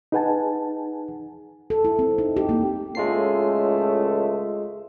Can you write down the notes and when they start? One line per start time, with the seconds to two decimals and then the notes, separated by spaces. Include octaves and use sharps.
0.12 D#4 G#4 B4 F#5 G#5 A5
1.70 A4
1.85 E4
1.99 C4
2.18 D#4
2.37 G4
2.49 A#3
2.95 C#2 A2 G#3 A3 F4 C7